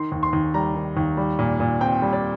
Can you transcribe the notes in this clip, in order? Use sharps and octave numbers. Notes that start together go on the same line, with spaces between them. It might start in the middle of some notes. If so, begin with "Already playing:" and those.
Already playing: D#3 C6
D#2
C6
D#2
G3 A#5
D#3
D#2
G3
A#2
A#2
C4 G5
G3
D5